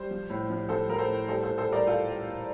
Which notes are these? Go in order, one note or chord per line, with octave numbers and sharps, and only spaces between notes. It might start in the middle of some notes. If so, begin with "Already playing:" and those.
Already playing: G3 C5
F3
A2
F3
F3 A4 C5
F3 A#4
A4 C5
A2
G3 A4 C5
A4 C5
A#2
A4 C5
G3 A#4 D5
A#2 F4 A4
G3
A#2